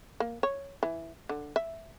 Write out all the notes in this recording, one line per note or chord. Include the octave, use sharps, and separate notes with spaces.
A#3
C#5
E3
D3
E5